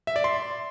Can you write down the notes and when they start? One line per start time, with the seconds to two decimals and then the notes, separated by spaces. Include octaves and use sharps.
0.07 E5
0.16 D5
0.24 C6